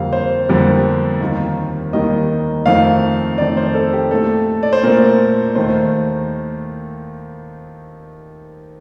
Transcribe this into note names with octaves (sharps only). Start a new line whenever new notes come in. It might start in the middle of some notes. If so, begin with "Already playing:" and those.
Already playing: F2 D3 G3 A#3 F5
C5
F2 D3 G3 A#3
D#2 D#3 G3 A#3
D#2 D#3 G3 A#3 D#5
F2 D#3 A3 F5
F2 D#3 A3 D5
C5
A4
G4
A#2 A3 A4
D5
C5
A#2 A3 A#4
D#2 D#3 A3 C5